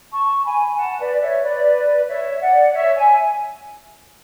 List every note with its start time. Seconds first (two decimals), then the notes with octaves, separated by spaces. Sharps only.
0.12 A5 C#6
0.45 G#5 B5
0.77 F#5 A5
0.99 B4 D5
1.21 C#5 E5
1.42 B4 D5
2.07 C#5 E5
2.40 D5 F#5
2.73 C#5 E5
2.94 E5 G#5